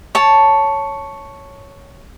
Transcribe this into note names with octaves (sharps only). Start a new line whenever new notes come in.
C#5 A5